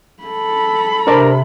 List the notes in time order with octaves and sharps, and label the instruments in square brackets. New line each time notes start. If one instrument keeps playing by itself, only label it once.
[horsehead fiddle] A4 B5
[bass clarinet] C3 [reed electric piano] D4 C5 D5 [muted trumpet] A#4